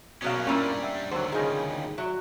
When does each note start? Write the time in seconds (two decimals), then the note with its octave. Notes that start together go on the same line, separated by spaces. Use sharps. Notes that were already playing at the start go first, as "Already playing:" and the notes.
0.22 B2 F#3 A#3 C#4 F5
0.47 A#2 G3 A#3 C#4 D4 E4
0.82 E5 F#5 G5
1.11 D2 D3 D#3 F#3 C5
1.32 C#3 G3 D#4 F4 G#4
1.98 F#3 E5